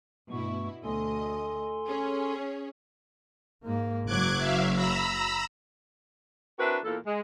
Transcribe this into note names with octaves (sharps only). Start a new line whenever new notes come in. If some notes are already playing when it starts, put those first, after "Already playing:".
G2 B2 A3 E4 C#6
D2 A4 D#5 G#5 C6
C#4 G#4 C#5
G#2 A#3
F#1 F#3 D6 F#6 G#6
E5 F5
A#5 B5 E6
C4 D4 E4 F#4 A#4 B4
E2 A#2 A#3 A4
G#3